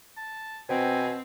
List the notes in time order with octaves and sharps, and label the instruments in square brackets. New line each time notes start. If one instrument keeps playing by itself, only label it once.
[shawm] A5
[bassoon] B2 [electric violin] C4 [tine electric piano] C5 G5 [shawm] G#5